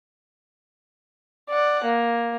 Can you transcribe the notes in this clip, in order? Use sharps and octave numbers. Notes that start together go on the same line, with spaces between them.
D5 F#5
A#3